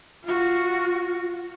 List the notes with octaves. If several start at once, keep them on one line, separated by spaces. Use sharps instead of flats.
F4 F#4